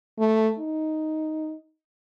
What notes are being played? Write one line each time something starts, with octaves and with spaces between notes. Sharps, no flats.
A3
D#4